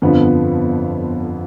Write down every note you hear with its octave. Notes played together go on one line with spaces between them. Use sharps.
G1 F2 D3 F3 B3